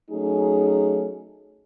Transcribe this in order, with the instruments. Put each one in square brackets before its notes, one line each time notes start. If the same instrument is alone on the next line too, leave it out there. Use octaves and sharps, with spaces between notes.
[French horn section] F#3 A3 C#4 D#4 G#4